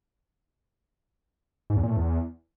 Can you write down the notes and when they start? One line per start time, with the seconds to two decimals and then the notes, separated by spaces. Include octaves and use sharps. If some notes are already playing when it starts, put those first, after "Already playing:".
1.70 G#2
1.77 E2
1.83 A#2
1.90 A2
1.97 E2